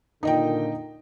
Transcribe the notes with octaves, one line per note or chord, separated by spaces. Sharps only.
A#2 D3 D#3 D#4 D#5 G5